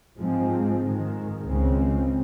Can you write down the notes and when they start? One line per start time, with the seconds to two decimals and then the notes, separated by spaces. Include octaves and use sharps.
0.17 G#2 F3 G#3 C4
0.80 G#2 D#3 G#3
1.43 C#2 C#3 G#3 C4